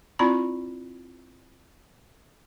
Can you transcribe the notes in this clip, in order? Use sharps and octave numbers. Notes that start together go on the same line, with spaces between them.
C4 E4 F4 D5 A#5 B5